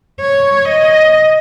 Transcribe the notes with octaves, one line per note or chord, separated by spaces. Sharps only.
C#5
D#5